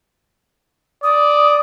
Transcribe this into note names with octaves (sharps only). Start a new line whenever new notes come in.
D5 D#6